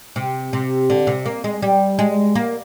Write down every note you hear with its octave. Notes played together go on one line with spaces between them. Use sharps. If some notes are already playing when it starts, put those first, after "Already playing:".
C3
C3
D3
C3
A#3
G#3
G3
G#3
A#3